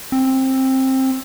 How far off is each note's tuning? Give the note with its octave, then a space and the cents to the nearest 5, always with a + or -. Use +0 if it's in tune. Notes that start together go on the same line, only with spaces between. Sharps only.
C4 +15